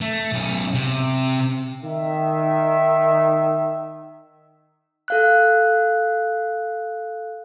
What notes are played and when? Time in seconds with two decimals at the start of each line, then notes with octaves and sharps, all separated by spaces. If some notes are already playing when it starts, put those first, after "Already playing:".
0.01 A3
0.32 B1 C#4
0.74 C3
1.83 D#3 E5
5.08 A4 F5 F#6